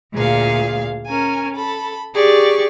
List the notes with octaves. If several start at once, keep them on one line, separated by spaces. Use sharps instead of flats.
D2 A#2 G#4 F5
C#4 A#4 G#5
A4 B5
G4 G#4 D5 C#6